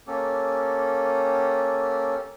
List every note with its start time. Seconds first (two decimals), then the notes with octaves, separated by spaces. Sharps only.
0.07 A#3 C#4 G4 A4